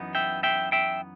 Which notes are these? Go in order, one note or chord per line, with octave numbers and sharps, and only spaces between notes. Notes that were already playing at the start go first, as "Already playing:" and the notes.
Already playing: F#2 E3 B3 D#4
E5 G5
E5 G5
E5 G5